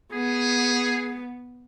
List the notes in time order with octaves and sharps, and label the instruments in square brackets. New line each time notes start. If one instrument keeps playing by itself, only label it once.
[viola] B3 [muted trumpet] G#4